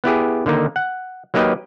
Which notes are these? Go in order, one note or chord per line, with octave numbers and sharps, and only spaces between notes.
B3 E4 G4 G#4
D3 D#3 A#3 D#4
F#5
F#3 A#3 D#4 G4 B4 D#5